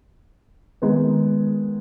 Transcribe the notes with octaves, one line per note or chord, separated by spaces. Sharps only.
D#3 G#3 B3 D#4